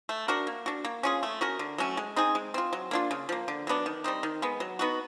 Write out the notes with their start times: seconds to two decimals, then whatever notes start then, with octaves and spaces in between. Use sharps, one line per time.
0.09 A3
0.28 D4 F#4 A#4
0.47 A#3
0.66 D4 F#4
0.85 A#3
1.03 C#4 F4 G#4
1.23 A3
1.41 C#4 F#4 A#4
1.59 D3
1.78 F#3 A3 C#4
1.97 G#3
2.16 C4 D#4 G#4
2.35 G#3
2.54 C4 F4
2.73 F#3
2.91 A#3 D4 F4
3.11 C#3
3.29 F3 A#3
3.48 D3
3.67 F#3 B3 D4
3.86 D#3
4.04 G3 C4 D#4
4.23 D#3
4.42 G#3 B3
4.60 F#3
4.79 B3 D#4 F#4